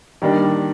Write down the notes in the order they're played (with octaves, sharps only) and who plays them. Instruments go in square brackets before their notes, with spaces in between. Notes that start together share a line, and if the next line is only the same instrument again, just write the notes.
[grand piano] D#3 G3 A#3 D4